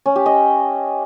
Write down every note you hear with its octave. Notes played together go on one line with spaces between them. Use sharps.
C#4
G4
D#5